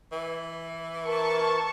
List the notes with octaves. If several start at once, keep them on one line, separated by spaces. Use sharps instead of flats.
E3
A#4 A5 C#6